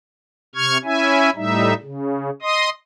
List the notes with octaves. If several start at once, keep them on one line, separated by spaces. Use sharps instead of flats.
C3 C#6 F6 G#6
C#4 E4 E5 G#5
A2 G3 D#4 E5
C#3
D#5 C6 D#6